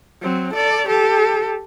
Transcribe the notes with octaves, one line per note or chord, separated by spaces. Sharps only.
F#3 C4
A4 D5
G4 A4